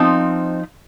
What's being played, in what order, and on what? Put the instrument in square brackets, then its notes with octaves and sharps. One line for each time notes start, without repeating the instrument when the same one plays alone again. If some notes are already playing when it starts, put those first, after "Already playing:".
Already playing: [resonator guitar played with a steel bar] F3 C4 D#4